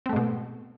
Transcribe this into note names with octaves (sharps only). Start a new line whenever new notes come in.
G#2 B2 A3 C4